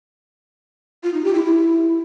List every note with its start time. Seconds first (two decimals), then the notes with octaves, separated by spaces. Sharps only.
1.03 F4
1.14 D#4
1.24 G4
1.34 E4
1.45 E4